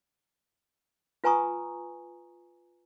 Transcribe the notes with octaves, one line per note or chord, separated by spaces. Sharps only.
F4 B4 G#5 A#5 C#6 D#6